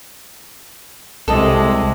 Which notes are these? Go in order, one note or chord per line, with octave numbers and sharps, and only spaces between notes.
C2 C3 G#3 A4 D#5